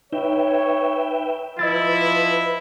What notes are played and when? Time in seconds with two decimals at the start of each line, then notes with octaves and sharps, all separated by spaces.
0.13 D#4 B4 C#5 E5 G5
1.59 F3 E4 B4 D#5 E6 A6